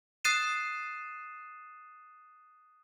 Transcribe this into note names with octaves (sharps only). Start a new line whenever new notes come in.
D#6 F#6 A6 C7 D#7 E7